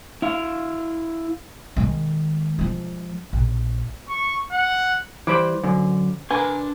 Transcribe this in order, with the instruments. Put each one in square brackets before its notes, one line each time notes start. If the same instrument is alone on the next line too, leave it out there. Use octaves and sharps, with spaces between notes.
[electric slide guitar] E4 F5
[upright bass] D#3 G#3
F3 G#3
A#1
[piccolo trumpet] C#6
F#5
[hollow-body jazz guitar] E3 G3 [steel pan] C5 B5 D6
[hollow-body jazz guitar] F#2 D3
[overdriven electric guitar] D4 C6 [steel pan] A#4 B4 [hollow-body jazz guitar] G#5